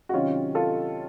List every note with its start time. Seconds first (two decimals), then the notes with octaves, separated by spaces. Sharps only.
0.09 F#4
0.14 C3 D#3 F#3 C#4 F4
0.55 F4 A4